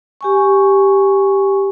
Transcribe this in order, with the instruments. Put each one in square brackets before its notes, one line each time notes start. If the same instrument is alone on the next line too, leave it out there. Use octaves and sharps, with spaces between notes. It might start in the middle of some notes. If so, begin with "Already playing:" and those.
[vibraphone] G4 G#5 C#6